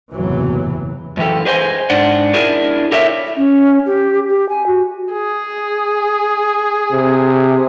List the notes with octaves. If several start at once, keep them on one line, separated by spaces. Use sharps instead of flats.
F#1 E2 A2 C3 E3 F#3
F#2 E3 G4 A4
G#4 B4 C5 D#5 F5 G#5
G#2 D4 F#5
D4 E4 G#4 A#4
E4 G4 A4 A#4 C#5 E5
C#4
G4
G4
G#5
F#4
G#4
C3